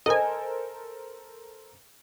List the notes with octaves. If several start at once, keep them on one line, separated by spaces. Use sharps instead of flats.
A4 A#4 C5 D#5 G#5